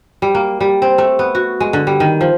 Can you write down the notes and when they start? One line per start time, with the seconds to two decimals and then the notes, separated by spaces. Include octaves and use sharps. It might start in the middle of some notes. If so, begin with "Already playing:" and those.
0.22 G3
0.35 A#3
0.61 G3
0.82 C4
0.98 A3
1.19 B3
1.35 F#4
1.60 G#3
1.73 D3
1.87 G3
2.00 D#3
2.21 F3